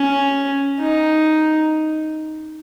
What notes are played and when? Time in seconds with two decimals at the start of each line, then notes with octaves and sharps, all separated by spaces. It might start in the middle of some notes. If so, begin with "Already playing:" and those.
Already playing: C#4
0.80 D#4